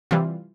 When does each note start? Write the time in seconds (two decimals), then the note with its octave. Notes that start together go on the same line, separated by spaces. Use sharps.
0.11 C3 E3 G3 F4